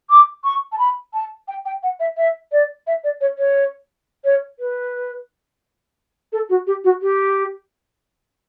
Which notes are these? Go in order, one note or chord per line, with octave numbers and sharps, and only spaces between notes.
D6
C#6
A5
B5
A5
G5
G5
F#5
E5
E5
D5
E5
D5
C#5
C#5
C#5
B4
A4
F#4
G4
F#4
G4